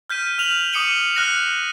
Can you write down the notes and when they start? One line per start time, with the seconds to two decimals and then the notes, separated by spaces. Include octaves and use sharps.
0.10 F6 G6 B6 D#7
0.38 F6 F7 F#7
0.73 D6 D#6 C#7 D#7 G7
1.15 F6 F#6 A#6 C#7